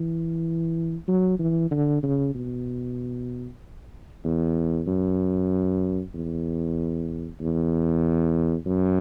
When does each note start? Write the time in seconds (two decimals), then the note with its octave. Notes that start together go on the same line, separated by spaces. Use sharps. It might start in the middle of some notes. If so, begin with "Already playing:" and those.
Already playing: E3
1.08 F#3
1.39 E3
1.71 D3
2.03 C#3
2.35 B2
4.24 E2
4.87 F#2
6.14 E2
7.41 E2
8.66 F#2